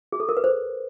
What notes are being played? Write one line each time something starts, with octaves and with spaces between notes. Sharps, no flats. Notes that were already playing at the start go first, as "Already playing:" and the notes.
G#4
A4
A#4
B4
C5